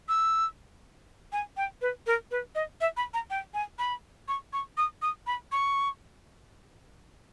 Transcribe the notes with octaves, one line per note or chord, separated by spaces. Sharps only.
E6
G#5
G5
B4
A#4
B4
D#5
E5
B5
A#5
G5
G#5
B5
C#6
C#6
D#6
D#6
B5
C#6